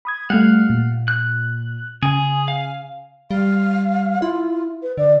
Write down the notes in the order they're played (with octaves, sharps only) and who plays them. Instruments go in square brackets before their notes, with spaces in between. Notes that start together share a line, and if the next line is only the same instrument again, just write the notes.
[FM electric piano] B5 D#6 G#6
[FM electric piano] G3 A3 [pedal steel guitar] F5 F#5
[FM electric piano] A#2
[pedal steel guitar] F#6
[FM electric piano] C#3 G#5 [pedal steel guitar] G#4
[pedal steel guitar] F5
[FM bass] G3 [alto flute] F5
[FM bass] E4 [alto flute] F4
[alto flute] B4
[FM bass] D3 [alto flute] D5